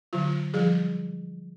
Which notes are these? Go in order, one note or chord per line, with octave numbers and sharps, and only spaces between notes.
D3 F#3 F4
F3 G3 G#4